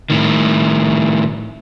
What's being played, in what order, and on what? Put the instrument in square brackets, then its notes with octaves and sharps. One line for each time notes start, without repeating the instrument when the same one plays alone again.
[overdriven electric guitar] A2 D#3